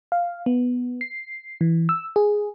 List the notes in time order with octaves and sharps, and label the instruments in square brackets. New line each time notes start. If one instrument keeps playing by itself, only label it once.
[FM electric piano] F5
B3
C7
E3
E6
G#4